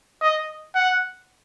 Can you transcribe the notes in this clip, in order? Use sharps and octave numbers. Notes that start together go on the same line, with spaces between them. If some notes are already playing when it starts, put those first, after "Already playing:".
D#5
F#5